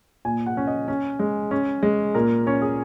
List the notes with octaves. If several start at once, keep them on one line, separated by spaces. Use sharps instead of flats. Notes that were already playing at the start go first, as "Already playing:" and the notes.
A#2 G#5
F#5
C#4
D#5
C#4
G#3
C#4
G#3
A#2 A#4
C#4 C#5
G#4